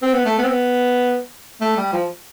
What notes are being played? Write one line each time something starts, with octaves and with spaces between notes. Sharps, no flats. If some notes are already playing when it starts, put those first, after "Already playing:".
C4
B3
A3
B3
C4
B3
A3
G3
F3